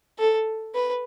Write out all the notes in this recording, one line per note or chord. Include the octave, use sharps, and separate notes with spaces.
A4
B4